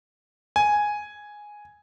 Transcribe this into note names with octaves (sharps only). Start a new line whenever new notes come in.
G#5